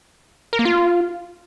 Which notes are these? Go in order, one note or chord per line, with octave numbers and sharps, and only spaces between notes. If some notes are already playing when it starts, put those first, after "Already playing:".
A#4
A#3
F4